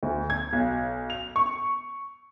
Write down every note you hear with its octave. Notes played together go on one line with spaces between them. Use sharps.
D2
G#6
B1
F7
C#6